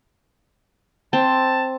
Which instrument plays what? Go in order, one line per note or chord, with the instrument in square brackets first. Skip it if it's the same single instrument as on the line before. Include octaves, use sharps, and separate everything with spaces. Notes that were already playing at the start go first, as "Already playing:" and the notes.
[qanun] C4 [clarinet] A5